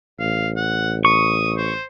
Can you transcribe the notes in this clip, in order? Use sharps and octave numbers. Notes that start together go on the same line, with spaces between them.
A1 F5
F#5
C#6 D#6
C5